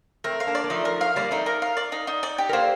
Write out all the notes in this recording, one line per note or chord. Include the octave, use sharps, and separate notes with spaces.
A3 C4 A#4
F5
A#3 D4
D5
A#3
F3 A3 D#4
A#4
F5
G3 A#3 D5
A3 C4 D#4
A#4
F5
D5
D#4
D#4
D5
G4
A#4
A#3 A4 C5